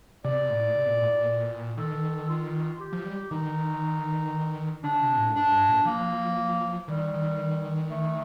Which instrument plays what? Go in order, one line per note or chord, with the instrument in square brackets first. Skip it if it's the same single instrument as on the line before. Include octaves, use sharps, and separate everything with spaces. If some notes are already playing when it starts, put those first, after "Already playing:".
[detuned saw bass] C3 [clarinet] D5
[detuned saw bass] A2
C3
A#2
A2
A#2
[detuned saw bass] D#3 [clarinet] A4
[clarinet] F4
G4
[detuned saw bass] F3
G3
[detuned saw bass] D#3 [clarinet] D#4
[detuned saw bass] D3 [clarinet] D4
[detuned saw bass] C3
A2
[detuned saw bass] G2 [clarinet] D4
[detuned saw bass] G2
A#2
[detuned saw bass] F3 [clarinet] A#3
[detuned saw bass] D#3 [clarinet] G3
[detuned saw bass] D#3
[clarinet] A3